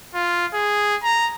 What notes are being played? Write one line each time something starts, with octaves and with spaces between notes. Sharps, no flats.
F4
G#4
A#5